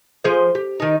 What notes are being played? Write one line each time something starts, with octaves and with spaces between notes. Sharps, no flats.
F3 G#4 C5
G4
D#3 D#4